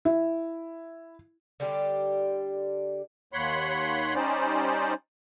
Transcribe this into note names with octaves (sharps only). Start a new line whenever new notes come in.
E4
D3 G3 D4 G4
D#2 C#5 F#5 B5 C6
G3 C#4 D#4 C5 D5